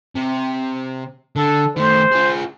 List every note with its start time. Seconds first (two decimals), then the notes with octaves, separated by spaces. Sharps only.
0.16 C3
1.36 D3 A4
1.77 D#3 A3 C5
2.12 F4 G#4